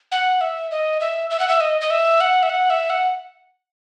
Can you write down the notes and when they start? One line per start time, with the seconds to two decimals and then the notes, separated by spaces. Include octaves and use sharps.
0.12 F#5
0.41 E5
0.71 D#5
1.01 E5
1.30 E5
1.40 F#5
1.49 E5
1.61 D#5
1.81 D#5
1.90 E5
2.21 F#5
2.43 E5
2.50 F#5
2.70 E5
2.90 F#5